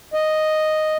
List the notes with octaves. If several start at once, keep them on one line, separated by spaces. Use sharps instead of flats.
D#5